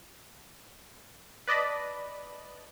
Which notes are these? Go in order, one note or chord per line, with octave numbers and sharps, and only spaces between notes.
B4 D5 D#5 A5 B5